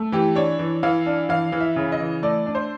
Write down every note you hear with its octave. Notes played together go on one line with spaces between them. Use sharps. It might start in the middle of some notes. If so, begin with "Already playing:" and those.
Already playing: A3
E3 G4
D4 C#5
E3
E3 F5
D4
E3 F5
E3
E5
C#3
D#5
E3
A3 D5
D4
C5